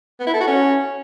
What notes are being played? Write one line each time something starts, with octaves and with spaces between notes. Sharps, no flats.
B3
E4
A4
F#4
C#4